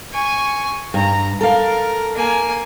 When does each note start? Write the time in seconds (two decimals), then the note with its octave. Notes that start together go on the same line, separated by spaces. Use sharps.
0.13 G#5 C#6
0.94 G2 A#5
1.41 A4 A#4 F5
2.15 A#3 G#5